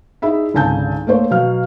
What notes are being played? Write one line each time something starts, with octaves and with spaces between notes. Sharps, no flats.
D#4 E4 G#4 E5 B5
G#1 C#2 D3 G#5 A5 G6
A3 A#3 C5 C#5
B2 F#3 F5 F6